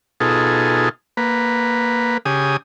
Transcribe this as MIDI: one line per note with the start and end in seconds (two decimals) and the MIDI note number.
0.20 0.89 47
0.20 0.89 63
0.20 0.89 65
0.20 0.89 68
0.20 0.89 69
1.17 2.17 58
1.17 2.17 71
2.25 2.57 49
2.25 2.57 67
2.25 2.57 80
2.25 2.57 87